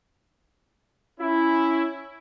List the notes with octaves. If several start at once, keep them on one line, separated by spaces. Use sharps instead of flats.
C#4 E4